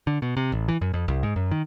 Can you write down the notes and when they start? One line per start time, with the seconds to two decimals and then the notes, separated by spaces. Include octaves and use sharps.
0.07 D3
0.22 B2
0.37 C3
0.52 A1
0.68 E3
0.81 F#2
0.94 F2
1.08 C2
1.23 G#2
1.36 F#2
1.51 D#3